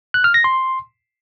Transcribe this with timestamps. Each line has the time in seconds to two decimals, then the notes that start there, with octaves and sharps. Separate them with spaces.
0.14 F#6
0.24 F6
0.34 A#6
0.44 C6